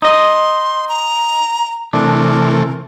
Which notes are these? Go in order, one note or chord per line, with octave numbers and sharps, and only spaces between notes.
D#4 D#5 C6
A#5
C3 E3 A3 D4 A#4